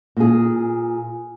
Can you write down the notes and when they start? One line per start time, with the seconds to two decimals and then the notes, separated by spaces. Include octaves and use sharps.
0.17 A#2 G#4